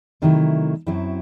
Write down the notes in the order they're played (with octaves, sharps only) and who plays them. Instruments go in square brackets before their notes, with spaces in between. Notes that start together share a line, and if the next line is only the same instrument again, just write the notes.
[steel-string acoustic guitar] C3 D#3 F#3 A3 E4
F#2 F#3 C4 E4